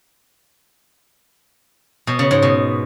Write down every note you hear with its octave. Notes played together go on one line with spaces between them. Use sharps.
B2
C#3
G#2
B2